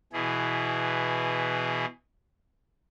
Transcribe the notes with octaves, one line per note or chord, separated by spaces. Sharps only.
B2 E3 G#4